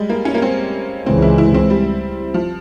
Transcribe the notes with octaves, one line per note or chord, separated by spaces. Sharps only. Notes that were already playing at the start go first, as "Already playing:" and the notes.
Already playing: G3 G#3
A#3
C#4
A#3
C4
C#2 C#3 E3 G#3 C4
E4
E4
C4
G3
F3